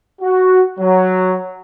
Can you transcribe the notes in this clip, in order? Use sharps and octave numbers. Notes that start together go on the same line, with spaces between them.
F#4
F#3